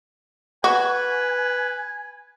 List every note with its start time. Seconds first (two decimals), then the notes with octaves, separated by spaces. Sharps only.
0.64 F#4 B4 G#5